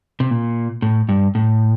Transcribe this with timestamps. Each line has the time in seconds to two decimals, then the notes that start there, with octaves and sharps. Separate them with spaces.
0.20 C3
0.31 A#2
0.82 A2
1.09 G2
1.35 A2